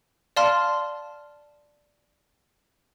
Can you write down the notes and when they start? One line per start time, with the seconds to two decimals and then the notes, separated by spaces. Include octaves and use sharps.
0.36 D5 F5 A5 C6 F6